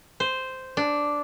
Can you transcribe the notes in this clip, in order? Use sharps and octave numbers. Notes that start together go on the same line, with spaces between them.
C5
D4